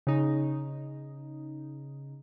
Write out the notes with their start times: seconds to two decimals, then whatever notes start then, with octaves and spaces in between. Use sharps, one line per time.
0.07 C#3 D#4